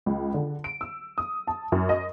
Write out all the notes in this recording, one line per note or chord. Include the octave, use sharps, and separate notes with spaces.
C#2
D3
D7
E6
D#6
A5
F#2
D#5